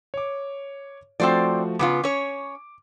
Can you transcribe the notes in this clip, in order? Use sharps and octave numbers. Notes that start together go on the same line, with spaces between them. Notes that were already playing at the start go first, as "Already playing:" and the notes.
C#5 D6
F3 A3 C4 F#4 C5 D5
C#3 B3 F4 D6
C#4 C#5